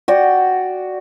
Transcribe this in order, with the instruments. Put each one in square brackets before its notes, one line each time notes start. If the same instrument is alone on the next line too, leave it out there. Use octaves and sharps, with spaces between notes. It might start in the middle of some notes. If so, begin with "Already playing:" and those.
[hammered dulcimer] F#4 D5 G5